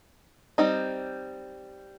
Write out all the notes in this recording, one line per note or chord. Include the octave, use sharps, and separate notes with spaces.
G3 C4 D#4